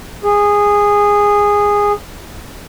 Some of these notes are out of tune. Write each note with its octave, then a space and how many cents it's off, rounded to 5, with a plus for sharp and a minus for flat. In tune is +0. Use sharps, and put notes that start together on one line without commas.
G#4 -15